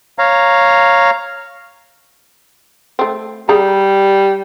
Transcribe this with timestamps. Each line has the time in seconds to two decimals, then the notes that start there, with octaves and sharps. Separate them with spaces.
0.19 C#5 F5 A#5
2.99 A3 C4
3.49 G3 G#4 A#5